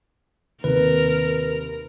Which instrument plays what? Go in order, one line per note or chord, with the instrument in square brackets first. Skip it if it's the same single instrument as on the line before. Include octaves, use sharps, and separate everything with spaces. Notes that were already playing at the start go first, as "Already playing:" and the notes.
[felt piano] D#2 C3 [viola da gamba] A#4 [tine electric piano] B4